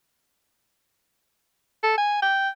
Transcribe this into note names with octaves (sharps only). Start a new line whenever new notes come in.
A4
G#5
G5